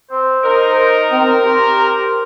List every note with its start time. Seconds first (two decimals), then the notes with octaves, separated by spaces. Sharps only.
0.11 C4 C5
0.44 D#4 A#4
1.12 C4
1.44 G4 C5